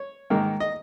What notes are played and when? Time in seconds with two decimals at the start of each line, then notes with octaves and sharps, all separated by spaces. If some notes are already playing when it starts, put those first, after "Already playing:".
Already playing: C#5
0.30 G#2 D#3 A#3
0.60 D#5